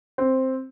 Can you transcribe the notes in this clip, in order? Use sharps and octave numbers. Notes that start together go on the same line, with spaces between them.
C4